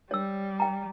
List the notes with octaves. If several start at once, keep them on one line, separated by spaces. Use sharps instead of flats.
G3 C#5 E6
G5 A#5